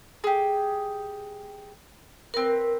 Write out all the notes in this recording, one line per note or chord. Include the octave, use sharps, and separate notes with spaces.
G4 G#4
C4 A#4 B4